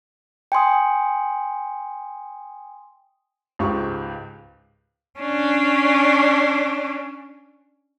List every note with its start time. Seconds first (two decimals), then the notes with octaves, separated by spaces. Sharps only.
0.52 G5 G#5 C6 D#6
3.59 C#2 G#2 G4 C#6
5.20 C#4 D4